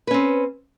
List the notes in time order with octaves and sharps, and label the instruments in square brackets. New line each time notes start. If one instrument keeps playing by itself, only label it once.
[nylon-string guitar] B4
C#4
C4